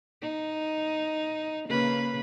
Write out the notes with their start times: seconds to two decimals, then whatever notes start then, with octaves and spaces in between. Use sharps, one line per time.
0.22 D#4
1.68 C#3 A#3 B4